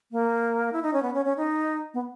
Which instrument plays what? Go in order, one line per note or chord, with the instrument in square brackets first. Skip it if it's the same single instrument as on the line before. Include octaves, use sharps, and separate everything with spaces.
[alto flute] A#3
E4
D#4
C#4
B3
C#4
C#4
D#4
B3